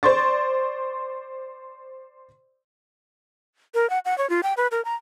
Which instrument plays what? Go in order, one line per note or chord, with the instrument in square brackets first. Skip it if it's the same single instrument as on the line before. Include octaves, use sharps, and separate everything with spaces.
[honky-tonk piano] C5 D5 C6 C#6 A6
[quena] A#4
F#5
F#5
C#5
F4
G5
B4
A#4
A#5